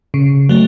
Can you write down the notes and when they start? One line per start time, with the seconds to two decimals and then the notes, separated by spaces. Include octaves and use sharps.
0.14 C#3
0.49 F#3 A3